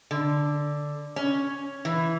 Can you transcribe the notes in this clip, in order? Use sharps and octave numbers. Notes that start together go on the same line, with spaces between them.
D3
C#4
E3